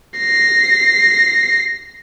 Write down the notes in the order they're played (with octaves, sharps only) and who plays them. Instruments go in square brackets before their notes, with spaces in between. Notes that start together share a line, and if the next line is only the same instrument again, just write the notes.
[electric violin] A#6 C7